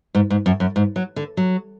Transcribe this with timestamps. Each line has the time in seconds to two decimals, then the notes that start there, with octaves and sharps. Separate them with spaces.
0.15 G#2
0.30 G#2
0.46 F#2
0.60 F#2
0.76 G#2
0.96 F#3
1.16 D3
1.37 F#3